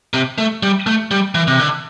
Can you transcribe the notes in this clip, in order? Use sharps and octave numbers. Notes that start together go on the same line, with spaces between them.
C3
A3
G3
A3
G3
E3
C3
D3